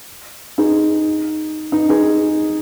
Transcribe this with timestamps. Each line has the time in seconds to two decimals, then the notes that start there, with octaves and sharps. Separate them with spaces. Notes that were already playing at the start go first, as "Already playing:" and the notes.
0.58 D#4 G#4
1.72 D#4
1.89 D#4 G#4